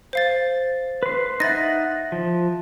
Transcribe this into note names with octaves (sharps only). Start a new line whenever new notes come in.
C5 F5 A6
B4 C6
D#4 E5 F#5 A6 A#6
F3